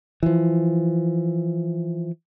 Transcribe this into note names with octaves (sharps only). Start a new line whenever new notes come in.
E3 F3